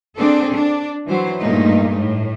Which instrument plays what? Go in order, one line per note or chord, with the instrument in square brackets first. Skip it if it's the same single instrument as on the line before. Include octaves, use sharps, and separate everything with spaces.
[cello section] C4 D4 G#4 A4
D4
E3 F#3 C5
G2 A#2 G#3 A3 D#4
A2